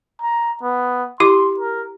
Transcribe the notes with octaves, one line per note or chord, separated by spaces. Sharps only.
A#5
B3
E4 G4 C6 D6
A#4